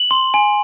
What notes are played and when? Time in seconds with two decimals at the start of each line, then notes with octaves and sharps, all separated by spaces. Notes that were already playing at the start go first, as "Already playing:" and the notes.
Already playing: F#7
0.11 C6
0.34 G#5